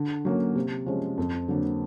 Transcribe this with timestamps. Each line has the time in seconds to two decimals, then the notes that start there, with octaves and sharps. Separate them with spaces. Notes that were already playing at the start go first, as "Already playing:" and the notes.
Already playing: D3
0.25 F#3 A#3 C#4
0.56 C3
0.86 F3 G#3 C#4
1.18 F2
1.48 D3 F#3 A#3 D4